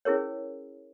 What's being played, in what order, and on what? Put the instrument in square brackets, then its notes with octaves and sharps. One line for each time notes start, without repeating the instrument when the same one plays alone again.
[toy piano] C#4 E4 G#4 A#4 C#5